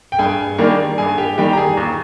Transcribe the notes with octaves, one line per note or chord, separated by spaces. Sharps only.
G5
G2 G#4 G#5
D#3 G3 A#3 D4
G2 G#4 G#5
G4 G5
D#3 G3 G4 G5
A#5
G#4 G#5
D#2